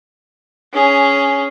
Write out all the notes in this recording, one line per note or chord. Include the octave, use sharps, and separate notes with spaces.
C#4 G#4